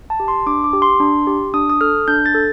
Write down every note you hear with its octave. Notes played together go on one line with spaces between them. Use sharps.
A5
G4
C6
D4 D6
D6
G4
C6
D4
G4
D4 D#6
D#6
A4 F6
D4 G6
A6
A4